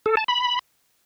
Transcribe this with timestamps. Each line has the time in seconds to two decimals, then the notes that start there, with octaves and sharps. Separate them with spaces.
0.06 A4
0.17 A5
0.28 B5